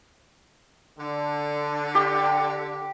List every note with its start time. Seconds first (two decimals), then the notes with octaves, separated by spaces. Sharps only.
0.98 D3
1.95 G4